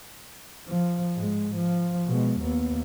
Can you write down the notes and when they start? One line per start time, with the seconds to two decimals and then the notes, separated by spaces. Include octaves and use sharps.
0.67 F3
1.14 G#2 G#3
1.55 F3
2.06 B2 G#3
2.40 D#2 B3